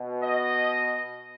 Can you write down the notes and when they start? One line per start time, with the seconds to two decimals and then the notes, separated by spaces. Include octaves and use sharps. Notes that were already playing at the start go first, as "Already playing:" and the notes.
Already playing: B2
0.23 D#5